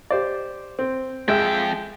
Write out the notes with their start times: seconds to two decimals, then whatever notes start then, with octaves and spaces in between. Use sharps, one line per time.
0.10 G4 C5 D5
0.79 C4
1.28 F2 G#3 E5 G5 E6